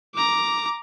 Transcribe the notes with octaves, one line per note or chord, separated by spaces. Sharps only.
A#5 D6